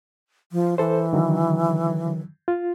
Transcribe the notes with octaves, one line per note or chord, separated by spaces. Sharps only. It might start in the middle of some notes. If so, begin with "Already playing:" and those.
F3
E3 A4 C5
D3 D#3 F#3
F4